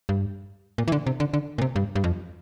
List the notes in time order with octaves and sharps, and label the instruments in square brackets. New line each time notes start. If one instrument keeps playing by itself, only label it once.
[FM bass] G2
A#2
E3
D3
C3
D3
D3
A#2
C3
G2
G2
F2